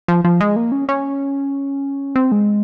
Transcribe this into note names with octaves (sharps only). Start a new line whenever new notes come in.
F3
F3
G#3
A#3
C#4
C#4
C4
G#3